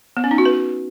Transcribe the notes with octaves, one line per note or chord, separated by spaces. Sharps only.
B3
C#4
D#4
F#4
B4